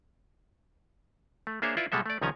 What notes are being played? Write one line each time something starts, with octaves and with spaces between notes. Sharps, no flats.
A3
A#3 D4 G#4 C5 C#5 E5
E4 F4 B4 D5 E5
B2 G3 G#3 A4 E5
A3 D5
C2 D#3 F3 C#4 G#5 A#5